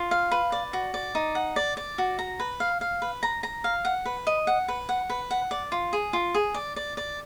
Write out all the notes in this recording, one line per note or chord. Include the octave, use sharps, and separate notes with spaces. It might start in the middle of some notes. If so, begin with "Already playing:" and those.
Already playing: F4
F5
B4
D5
F#4
D5
D#4
F#5
D5
D5
F#4
A#5
B4
F5
F5
B4
A#5
A#5
F5
F#5
B4
D#5
F#5
B4
F#5
B4
F#5
D5
F4
G#4
F4
G#4
D5
D5
D5